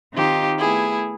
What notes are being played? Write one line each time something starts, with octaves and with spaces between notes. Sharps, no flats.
D#3 C4 D#4 F4 G4
A3 B3 E4 G#4